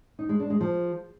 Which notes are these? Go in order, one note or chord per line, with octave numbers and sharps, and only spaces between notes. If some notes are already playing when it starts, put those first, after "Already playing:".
D#4
G#3
D4
G#3
F3